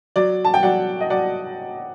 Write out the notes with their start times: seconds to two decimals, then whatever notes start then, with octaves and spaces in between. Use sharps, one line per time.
0.16 F#3 D5
0.45 A5
0.54 G5
0.63 F#3 D5 F#5
1.01 D#5
1.10 F#3 D5 F#5